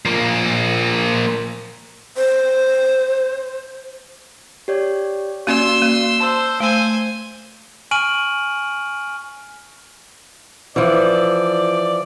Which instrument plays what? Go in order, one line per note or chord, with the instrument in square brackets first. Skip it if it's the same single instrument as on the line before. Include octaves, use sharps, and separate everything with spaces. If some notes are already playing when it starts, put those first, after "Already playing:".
[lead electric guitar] F3 A#3
[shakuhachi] C5
[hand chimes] G4 C#5 D5
[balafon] A#3 C#4 [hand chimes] F#4 D5 [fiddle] C6 E6
[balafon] A#3
[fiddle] C5 [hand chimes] A5 C6 E6
[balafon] A3 [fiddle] C5 G#5
[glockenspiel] G#5 C#6 F6 D7 D#7 F#7
[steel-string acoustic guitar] E3 F3 [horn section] D5